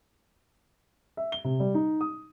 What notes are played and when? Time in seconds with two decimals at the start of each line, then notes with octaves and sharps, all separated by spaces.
1.17 E5
1.32 G7
1.44 C3
1.60 G3
1.74 D#4
2.01 D#6